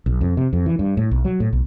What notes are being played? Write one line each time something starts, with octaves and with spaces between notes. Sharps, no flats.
B1
F2
C3
F2
E3
G2
A2
B1
F#3
A2
B1